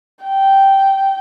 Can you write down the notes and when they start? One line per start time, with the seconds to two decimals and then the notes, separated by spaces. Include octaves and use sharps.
0.24 G5